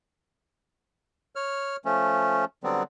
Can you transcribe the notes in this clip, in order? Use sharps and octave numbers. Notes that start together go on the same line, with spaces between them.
C#5 F6
F3 A3 C#4
D3 F#3 G3 B3 C4